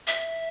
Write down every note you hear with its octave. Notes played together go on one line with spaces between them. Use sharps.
E5